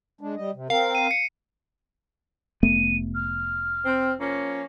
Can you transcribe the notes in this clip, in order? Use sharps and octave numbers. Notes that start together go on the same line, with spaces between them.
G#3 D4
G3 D#5
C3
C4 A#4 F5
C7 D#7
C7 C#7
F1 A3 B3 D#7
F6
C4
F3 A#3 C#4